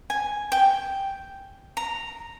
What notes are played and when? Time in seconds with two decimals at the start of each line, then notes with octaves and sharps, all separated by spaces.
0.10 G#5
0.52 G5
1.77 A#5